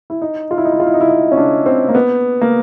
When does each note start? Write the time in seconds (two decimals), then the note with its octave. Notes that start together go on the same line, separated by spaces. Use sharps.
0.10 E4
0.22 D#4
0.51 F4
0.58 E4
0.65 D#4
0.72 E4
0.80 F4
0.87 E4
0.94 D#4
1.01 E4
1.09 D#4
1.32 C#4
1.37 D4
1.66 C4
1.89 A#3
1.95 B3
2.41 A#3